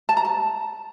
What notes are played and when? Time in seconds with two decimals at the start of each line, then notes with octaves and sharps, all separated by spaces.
0.09 A5
0.17 A#5
0.25 A5